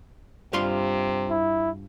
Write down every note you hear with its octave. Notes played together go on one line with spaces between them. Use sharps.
G2 C3 F4 C6
E4